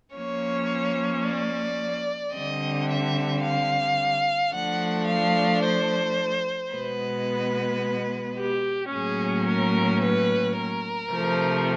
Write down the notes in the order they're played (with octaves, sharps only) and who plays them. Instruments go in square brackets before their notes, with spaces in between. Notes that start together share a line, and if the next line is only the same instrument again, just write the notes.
[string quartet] F3 A#3 C#4 C#5
D5
D3 G3 C4 D#5
E5
F5
F3 A3 D4 F#5
F5
C5
B2 G#3 B3 B4
G4
A2 F#3 A#3 C#4 G#4
A#4
B4
A#4
C3 F3 A3